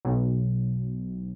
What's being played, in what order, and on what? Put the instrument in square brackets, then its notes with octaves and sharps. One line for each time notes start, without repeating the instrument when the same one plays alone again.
[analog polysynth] B1